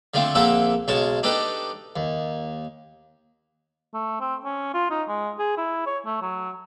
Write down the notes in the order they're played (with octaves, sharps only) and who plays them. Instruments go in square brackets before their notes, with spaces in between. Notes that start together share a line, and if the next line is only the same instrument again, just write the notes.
[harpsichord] D3 F3 A3 C4
A#1 A#3 C4 A4 E5 F#5
B1 G#3 C#4 A5
D4 D#4 G4 A4 B4
D#2
[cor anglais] A3
C4
C#4
F4
D#4
G#3
G#4
E4
C#5
A3
F#3